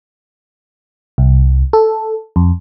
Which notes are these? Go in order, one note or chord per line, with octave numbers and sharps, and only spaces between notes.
C2
A4
F2